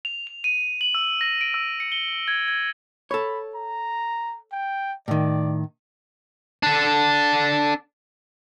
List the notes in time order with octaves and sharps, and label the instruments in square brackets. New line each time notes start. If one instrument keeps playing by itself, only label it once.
[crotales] F7
F7
D#7
F#7
E6
A#6
D7
E6
C#7
G7
G#6
G#6
[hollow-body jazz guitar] A4 C#5 [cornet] B5
[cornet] A#5
G5
[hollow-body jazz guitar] A2 D#3 [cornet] D5
[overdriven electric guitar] D4 A4